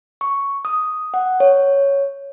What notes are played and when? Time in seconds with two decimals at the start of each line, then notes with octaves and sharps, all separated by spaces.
0.21 C#6
0.65 D#6
1.14 F#5
1.40 C#5